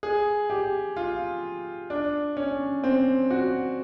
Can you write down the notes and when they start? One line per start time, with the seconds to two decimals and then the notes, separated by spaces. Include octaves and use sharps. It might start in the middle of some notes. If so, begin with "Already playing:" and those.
0.03 G#4
0.50 G4
0.97 F4
1.90 D4
2.37 C#4
2.84 C4
3.31 F#4